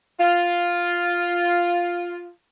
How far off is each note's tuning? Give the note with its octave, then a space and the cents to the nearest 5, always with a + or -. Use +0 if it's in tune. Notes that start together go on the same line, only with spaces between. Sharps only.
F4 +0